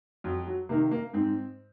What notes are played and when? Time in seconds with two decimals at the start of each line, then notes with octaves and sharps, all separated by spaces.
0.24 F2 F#3
0.47 F#3
0.69 C3 D#3 A#3
0.91 A#3
1.13 G#2 C4